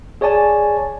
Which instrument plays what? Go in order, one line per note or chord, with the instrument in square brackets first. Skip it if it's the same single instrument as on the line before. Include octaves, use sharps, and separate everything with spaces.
[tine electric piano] G#4 C#5 D5 G#5 A5